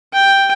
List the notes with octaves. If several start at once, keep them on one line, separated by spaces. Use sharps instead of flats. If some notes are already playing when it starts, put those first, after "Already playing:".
G5